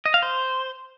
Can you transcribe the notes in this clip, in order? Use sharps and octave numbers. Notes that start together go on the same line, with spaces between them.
D#5
F5
C5